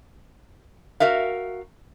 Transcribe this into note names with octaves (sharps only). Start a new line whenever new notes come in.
F#4 A#4 E5 F5